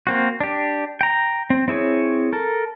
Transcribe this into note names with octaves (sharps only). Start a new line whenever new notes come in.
A#3 C4 F#4
D4 G4
G5 A#5
C4
C4 E4 G#4 C#5
A4 A#4